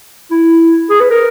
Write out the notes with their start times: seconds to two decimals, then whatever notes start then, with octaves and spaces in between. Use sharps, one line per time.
0.31 E4
0.90 G#4
1.00 B4
1.11 A#4